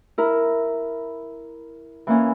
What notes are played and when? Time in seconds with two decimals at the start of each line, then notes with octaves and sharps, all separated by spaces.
0.18 E4 A#4
2.07 E3 A#3 C#4